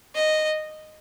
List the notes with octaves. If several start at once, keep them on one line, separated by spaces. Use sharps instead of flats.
D#5